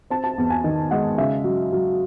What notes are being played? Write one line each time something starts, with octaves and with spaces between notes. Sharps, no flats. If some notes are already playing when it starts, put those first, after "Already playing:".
C4 A5
A5
E2
G#5
D#3
G#3 F#5
C#3 E5
F#3
F#3